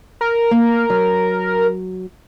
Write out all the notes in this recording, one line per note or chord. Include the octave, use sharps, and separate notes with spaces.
A#4
A#3
F#3